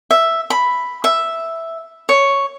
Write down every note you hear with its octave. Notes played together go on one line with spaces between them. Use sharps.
E5
B5
E5
C#5